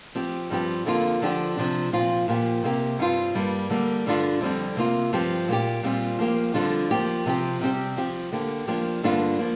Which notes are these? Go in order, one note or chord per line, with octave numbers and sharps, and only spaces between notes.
F3 C4 G4
G2 F3 C4 G4
F2 D3 A#3 F4
D3 F3 D4 G4
C3 F3 D4
A#2 F3 C4 F4
A#2 F3 A#3 G4
C3 A#3 G4
G2 G3 C4 F4
G2 G3 A#3
D3 G3 A#3
G2 D3 G3 D4 F4
F2 D3 G3 C4
C3 A#3 F4
G2 F3 C4 G4
A#2 A#3 G4
A#2 G3 C4 F4
F3 A#3 G4
F2 D3 G3 D4 F4
F3 A#3 G4
C3 F3 C4 G4
C3 G3 C4 G4
F3 C4 G4
D3 A#3 G4
F3 A#3 D4 G4
G2 D3 A#3 D4 F4
F3 A#3